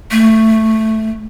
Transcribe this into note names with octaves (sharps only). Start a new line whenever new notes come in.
A3